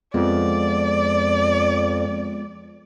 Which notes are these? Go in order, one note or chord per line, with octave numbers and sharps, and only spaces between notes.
F2 G#3 B3 F4 D5